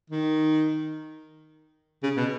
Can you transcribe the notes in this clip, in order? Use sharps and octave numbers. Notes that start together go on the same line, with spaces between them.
D#3
C#3
B2